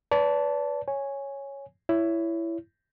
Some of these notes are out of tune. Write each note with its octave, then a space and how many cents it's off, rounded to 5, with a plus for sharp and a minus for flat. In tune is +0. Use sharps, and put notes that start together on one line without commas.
B4 +0 D5 -40 A5 +0
C#5 +0 G#5 -5
E4 +15 C#5 +20